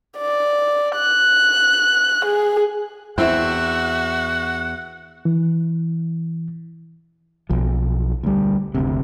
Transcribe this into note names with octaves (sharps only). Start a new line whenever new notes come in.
D5
F#6
G#4
E2 C4 E4 F#4 E5 F#5
E3
B1 F3
D2 G3
F#1 D2 C3